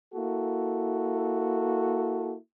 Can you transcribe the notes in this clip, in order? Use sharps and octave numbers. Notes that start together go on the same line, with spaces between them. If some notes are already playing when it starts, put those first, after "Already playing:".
A#3 E4 F#4 A4